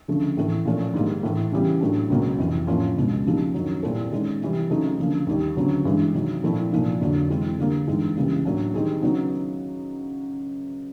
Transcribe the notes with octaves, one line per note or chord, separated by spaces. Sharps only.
D2 C#3 F3 A3
A2 E3 A3
A#2 F3 A3 C#4
G#2 D#3 G3 A#3
A2 E3 A3
C#3 E3 G3 B3
A2 F#3 A3 D4
C#2 B2 F#3 A#3
F2 C3 E3
A2 F3 A#3 C#4 F4
C#2 B2 G#3
C#3 F3 A#3 D#4 G4
F#2 D#3 F#3
A#2 G3 C4 E4 A4
D#3 G#3 C#4
C3 E3 G3
C#3 F#3 A3 C4 D#4
D2 C#3 F3 A#3
D#2 D#3 G3
D2 C#3 F#3 B3
G2 E3 G#3
C3 D#3 F#3
A#2 F3 A3 C4 E4
C2 A#2 F3 A#3 D#4
F2 D3 F#3 A#3
C3 E3 G#3 C4 E4
D3 G3 A#3
G2 E3 G#3 C4 D#4
C#2 C#3 E3 G3 A#3
A2 F#3 A#3 D4
D#3 G3 C4 D#4 G#4
C#3 F#3 B3 D#4